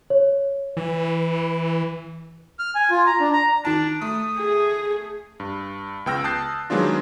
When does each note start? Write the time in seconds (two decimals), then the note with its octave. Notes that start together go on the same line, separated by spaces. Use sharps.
0.10 C#5
0.77 E3
2.59 F6
2.75 G#5
2.90 F4
3.06 A#5
3.20 D4
3.33 A#5
3.65 D#3 D4 A5
4.01 A3 D#6
4.38 G#4
5.40 G2
6.06 C#2 B3 G5 E6 F6 A#6
6.24 A5 D#6 F#6 G6 A6 C7
6.70 D#3 F#3 G#3 B3 D4 F4